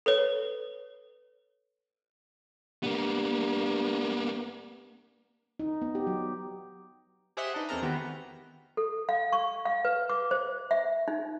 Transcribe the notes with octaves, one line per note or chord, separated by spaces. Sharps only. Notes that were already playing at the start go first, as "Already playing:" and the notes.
A4 B4 C#5
G2 A#3 B3
D#4
B3
G4
F#3
G4 G#4 C5 D#5 E5 F#5
D4 D#4 B4
E2 G#3 C4 A4 A#4 A#5
D#3 G#3 B3 F#4 G4 B4
A4
F5
C#6
F5
B4
D6
C5
E5
D#4